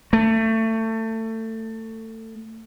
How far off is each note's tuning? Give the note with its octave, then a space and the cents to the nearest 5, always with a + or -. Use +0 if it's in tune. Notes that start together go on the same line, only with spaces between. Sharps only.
A3 +25